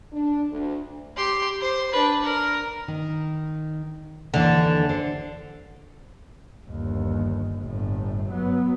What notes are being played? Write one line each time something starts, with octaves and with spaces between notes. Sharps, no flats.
D4
D2
G4 C6
C5
D4 B4
A#4
D#3
D#2 D3 E3 D4
D3 C5
G1 D#2
G1 A2
F#3 B3